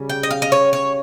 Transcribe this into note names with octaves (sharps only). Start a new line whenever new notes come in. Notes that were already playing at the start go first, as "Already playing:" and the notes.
Already playing: C#3 G3 C#4
G5
D#5
F5
D#5
C#5
C#5